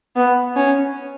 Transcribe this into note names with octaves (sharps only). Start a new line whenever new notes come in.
B3
C#4